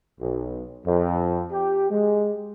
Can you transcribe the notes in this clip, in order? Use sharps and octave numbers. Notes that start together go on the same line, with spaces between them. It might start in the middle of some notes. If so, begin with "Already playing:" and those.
B1
F2
G4
G#3